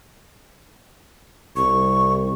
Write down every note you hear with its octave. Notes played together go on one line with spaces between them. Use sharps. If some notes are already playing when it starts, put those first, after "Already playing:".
C2 C#6